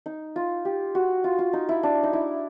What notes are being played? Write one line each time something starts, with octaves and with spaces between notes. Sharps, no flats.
D#4
F4
G4
F#4
F4
F4
D#4
E4
D4
D#4
E4